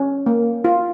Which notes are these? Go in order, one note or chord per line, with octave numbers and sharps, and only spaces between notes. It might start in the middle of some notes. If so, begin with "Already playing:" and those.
Already playing: C#4
A#3
F4